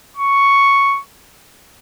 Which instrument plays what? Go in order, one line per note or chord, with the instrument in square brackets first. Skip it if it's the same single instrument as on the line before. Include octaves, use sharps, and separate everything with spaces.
[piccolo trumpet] C#6